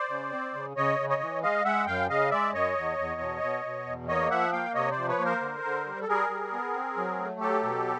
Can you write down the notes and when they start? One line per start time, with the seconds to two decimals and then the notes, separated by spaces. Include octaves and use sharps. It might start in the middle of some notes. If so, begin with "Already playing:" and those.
Already playing: C5 D5
0.09 C#3
0.32 C4
0.54 C#3
0.76 C#3 C#5 D#5
0.99 C#3
1.09 C#5 D#5
1.21 E3
1.42 G#3 D#5 F5
1.64 G#3 E5 F#5
1.87 F#2 F5 G5
2.09 C#3 D#5 F5
2.31 G#3 D5 E5
2.53 F#2 C#5 D#5
2.76 E2
2.98 E2
3.21 B2
3.42 B2
3.65 B2
3.87 E2
4.08 A#3 C#5 D#5
4.30 F3 E5 F#5
4.52 A#3 F5 G5
4.74 C3 C#5 D#5
4.91 C5 D5
4.98 F3
5.08 B4 C#5
5.19 A#3
5.24 A#4 C5
5.41 D3
5.64 D3
5.86 G3
6.01 A4
6.08 G3 G#4 A#4
6.30 G3
6.53 B3
6.74 C4
6.97 F#3
7.18 A3
7.40 F#3 G4 A4
7.63 B2